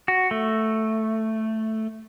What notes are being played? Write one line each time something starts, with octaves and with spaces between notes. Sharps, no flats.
F#4
A3